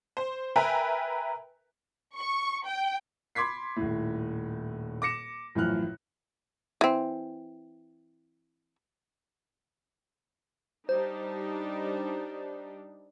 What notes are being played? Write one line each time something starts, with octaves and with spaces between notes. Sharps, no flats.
C5
A#4 B4 E5 G5 G#5 A#5
C#6
G5
B5 C6 D6 G#6 B6 C7
D#1 A2
D6 A#6 C#7 E7
A1 F#2 A2 F3 F6 F#6
E3 C4
G3 D4 D#4 C5